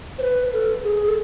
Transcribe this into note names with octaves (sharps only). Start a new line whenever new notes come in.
C5
B4
A4
G#4
A4